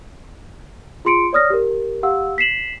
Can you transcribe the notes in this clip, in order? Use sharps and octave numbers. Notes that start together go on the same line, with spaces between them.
F4 G#4 C6 C#7 D7
C#5 D5 D#6 F6 A#6
G4 A#4
G4 F5 F#5 E6
B6 C7 E7 F#7